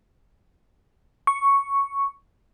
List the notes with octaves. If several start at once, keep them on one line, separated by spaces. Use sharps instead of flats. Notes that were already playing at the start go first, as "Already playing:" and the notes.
C#6